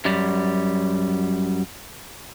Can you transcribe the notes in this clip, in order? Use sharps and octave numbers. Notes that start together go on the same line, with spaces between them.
F#2 G3